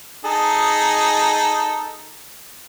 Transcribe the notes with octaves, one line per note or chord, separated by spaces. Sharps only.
D#4 G#4 A4